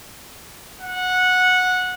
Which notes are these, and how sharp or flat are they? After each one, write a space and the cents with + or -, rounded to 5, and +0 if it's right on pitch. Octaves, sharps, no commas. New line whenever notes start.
F#5 -15